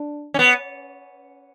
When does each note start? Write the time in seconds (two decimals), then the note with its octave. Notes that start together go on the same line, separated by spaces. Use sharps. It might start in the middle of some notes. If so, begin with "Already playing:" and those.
Already playing: D4
0.34 C#4
0.39 B3